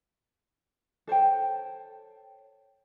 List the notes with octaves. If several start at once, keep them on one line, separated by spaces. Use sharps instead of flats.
A4 C5 C#5 G5